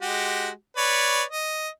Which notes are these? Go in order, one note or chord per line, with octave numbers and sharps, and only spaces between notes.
G#3 F#4 G4
B4 C#5 D5
D#5